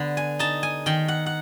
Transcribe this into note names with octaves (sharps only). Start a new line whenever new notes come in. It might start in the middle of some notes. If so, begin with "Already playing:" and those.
Already playing: D3 B3
G#5
D#4 A5
G#5
D#3 G5
F#5
F#5